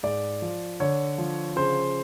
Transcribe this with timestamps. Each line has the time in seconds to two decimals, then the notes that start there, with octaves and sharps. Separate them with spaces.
0.03 G#2 D5
0.42 F3
0.80 D3 C#5
1.18 F3
1.56 C#3 C5